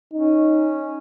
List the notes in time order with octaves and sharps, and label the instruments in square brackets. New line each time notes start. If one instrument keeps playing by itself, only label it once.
[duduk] C#4 [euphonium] D#4